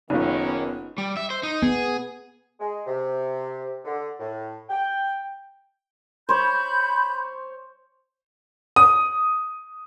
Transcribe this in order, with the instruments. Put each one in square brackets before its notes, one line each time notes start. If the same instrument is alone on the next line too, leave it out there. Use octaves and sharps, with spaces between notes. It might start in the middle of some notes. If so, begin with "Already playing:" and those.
[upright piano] F#1 [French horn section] D#3 A#3 C#4 [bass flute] B3 [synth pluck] D#4 F4
[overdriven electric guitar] G3
E5
C5
D#4
[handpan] B3 [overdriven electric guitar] G#4
[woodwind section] G#3
C3
D3
A2
G5
[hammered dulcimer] C5 C#5 [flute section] B5 G6
[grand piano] D#6